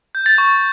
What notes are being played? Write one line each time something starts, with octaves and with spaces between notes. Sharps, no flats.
G6
A6
C#6